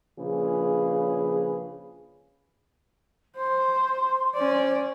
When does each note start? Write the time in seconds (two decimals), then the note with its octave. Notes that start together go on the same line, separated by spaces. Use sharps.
0.19 A#1 C#3 G#4 B4
3.36 C5 C6
4.34 C#4 C5 D5